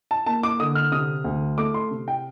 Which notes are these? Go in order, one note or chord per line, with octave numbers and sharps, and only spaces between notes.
A5
A#3 A5
D6
D3 D#6
F6
C3 D#6
D2
A3 D6
C6
C3
G5